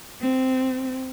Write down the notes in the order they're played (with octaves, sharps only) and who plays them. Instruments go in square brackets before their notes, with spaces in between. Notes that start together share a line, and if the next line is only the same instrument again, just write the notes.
[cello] C4